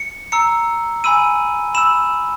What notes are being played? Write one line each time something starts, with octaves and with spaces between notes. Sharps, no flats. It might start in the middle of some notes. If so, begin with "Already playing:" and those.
Already playing: C#7
A#5 E6 C#7
G#5 B5 E6 D#7
B5 E6 E7